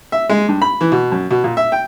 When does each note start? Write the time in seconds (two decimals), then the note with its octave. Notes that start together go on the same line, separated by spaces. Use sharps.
0.12 E5
0.30 G#3
0.48 G2
0.62 B5
0.81 E3
0.92 B2
1.12 F#2
1.31 B2
1.44 A#2
1.57 E5
1.72 G5